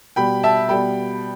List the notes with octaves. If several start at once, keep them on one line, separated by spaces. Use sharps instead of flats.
B2 G3 G5 B5
E5 A5
B2 G3 G5 B5